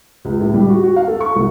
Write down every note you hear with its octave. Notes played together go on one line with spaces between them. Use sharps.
C#2
A2
G3
F#4
F#4
F5
A4
C#6
C2